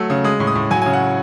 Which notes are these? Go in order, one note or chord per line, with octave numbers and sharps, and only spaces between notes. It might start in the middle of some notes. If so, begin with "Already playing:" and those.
Already playing: F#3 A3 E6
C#3
G#3 D#6
A2
D#6
A2
F#3 G#5
G#5
C#3
F#5